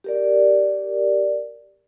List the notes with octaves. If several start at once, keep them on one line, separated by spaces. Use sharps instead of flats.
G4 A#4 D5